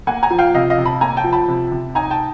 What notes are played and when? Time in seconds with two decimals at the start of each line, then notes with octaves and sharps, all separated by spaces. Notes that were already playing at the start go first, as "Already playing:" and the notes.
0.07 A#3 F#5 G#5
0.23 G#5 A#5
0.30 F3
0.39 F5 G5
0.54 C3 D#5 F5
0.70 D#5 F5
0.78 C3
0.85 A5 B5
1.01 A#3 G#5 A#5
1.17 G5 A5
1.24 F3
1.32 A5 B5
1.48 C3
1.72 C3
1.95 D#4 G#5 A#5
2.11 G5 A5